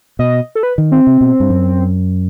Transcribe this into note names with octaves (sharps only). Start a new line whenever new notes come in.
B2 D#5
A4
B4
D#3
C4
C3
B2
G2
F#2